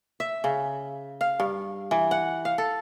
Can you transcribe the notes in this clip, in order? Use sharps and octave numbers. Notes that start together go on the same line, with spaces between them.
E5
C#3
F5
G2
E3
F#5
F5
A4